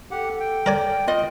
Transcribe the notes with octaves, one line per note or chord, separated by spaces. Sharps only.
G4 A4 F#5
G5
A#4 D5 G#5
F4 D#5